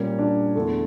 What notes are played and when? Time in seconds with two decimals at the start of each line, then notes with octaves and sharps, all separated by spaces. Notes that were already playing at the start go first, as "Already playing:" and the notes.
Already playing: A#2 G3 A#3 C#4
0.19 D4
0.55 E2 D3 A3